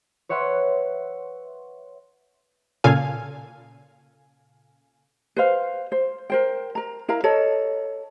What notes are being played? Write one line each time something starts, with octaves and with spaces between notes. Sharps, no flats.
B4 C#5 E5 F#5 C6
A#2 C#3 A4 F5 G#5
B4 C5 F5
C5
A#4 C5 G5
A#4 A#5
E4 A#4 F5 A#5
A4 C#5 D#5